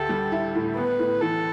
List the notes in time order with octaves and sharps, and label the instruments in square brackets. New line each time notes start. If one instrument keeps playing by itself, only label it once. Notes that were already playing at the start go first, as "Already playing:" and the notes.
Already playing: [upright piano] D2 G4 [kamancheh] A4
[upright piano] G3
E4
A2
[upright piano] B3 [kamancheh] B4
[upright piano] A2
[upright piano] E3 [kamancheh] A4